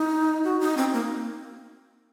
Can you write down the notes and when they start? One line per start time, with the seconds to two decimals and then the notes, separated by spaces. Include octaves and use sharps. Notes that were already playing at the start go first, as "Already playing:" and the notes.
Already playing: D#4
0.44 F#4
0.60 D#4
0.77 C4
0.93 A#3